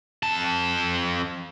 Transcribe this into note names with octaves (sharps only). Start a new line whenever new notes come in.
F2 A5